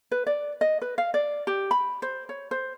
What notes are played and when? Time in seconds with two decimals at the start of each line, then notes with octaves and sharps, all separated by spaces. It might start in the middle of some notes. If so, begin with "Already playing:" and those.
0.12 B4
0.27 D5
0.61 D#5
0.82 B4
0.98 F5
1.14 D5
1.47 G4
1.71 B5
2.02 C5
2.29 C#5
2.51 C5